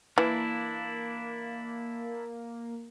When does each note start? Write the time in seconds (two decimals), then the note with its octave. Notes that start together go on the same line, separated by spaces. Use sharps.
0.18 E3 A#3 D4 E4